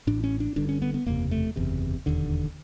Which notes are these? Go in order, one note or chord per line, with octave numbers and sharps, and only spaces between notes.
A1 A2 D4
C#4
D4
G1 G2 D3 D4
C#4
B3
B3
F#1 E2 C3 A#3
A3
F#1 E2 C3
E1 D#2 D3